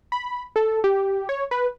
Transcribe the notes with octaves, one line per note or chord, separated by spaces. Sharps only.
B5
A4
G4
C#5
B4